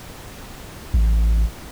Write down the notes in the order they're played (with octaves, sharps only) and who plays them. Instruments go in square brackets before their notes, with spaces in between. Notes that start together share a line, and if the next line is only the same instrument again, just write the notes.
[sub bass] A1